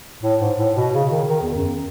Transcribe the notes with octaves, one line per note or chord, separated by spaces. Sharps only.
A2
G#2
A2
B2
C#3
D#3
D#3
E2
F#2